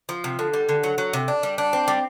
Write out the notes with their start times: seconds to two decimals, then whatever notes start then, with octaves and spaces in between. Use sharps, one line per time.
0.09 F3
0.24 C3
0.39 D3
0.53 G3
0.69 D3
0.83 F#3
0.98 F#3
1.13 C3
1.28 D4
1.43 G3
1.58 D4
1.73 C4
1.88 G3